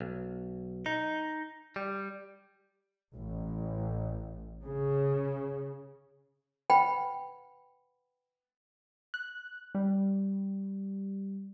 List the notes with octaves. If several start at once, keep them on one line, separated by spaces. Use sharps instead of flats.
B1
D#4
G3
A1
C#3
B4 F#5 G5 B5
F#6
G3